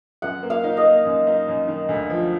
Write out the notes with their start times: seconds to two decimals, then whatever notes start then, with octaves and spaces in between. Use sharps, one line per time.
0.22 F#2 F#5
0.43 A#3
0.50 F5
0.64 D#4
0.77 D#5
0.84 A#3
1.05 F#2
1.27 D#4
1.48 F#2
1.68 D#3
1.89 D2
2.10 F3